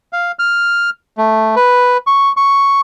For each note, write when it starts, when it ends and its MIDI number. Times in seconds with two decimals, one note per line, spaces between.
0.13 0.32 77
0.39 0.90 89
1.18 1.55 57
1.56 1.97 71
2.07 2.32 85
2.37 2.81 85